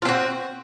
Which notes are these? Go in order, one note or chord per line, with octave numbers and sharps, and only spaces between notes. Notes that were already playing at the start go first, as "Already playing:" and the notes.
C4 F4 F#4